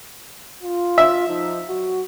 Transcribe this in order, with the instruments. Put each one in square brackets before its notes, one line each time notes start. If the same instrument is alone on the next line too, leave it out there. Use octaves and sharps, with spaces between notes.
[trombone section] F4
[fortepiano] E5
[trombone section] F3 D#4
F#3 F#4